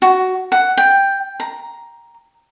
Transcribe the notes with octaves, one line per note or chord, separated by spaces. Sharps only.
F#4
F#5
G5
A#5